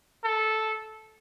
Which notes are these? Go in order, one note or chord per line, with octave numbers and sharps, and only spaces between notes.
A4